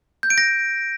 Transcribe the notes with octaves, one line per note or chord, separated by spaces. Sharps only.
G6
D7
A#6